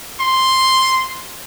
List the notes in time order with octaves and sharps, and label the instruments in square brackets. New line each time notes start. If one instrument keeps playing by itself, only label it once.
[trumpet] C6